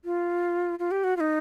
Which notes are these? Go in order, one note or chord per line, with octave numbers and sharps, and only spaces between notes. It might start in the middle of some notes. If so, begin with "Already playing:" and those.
F4
F4
G4
F#4
F4
D#4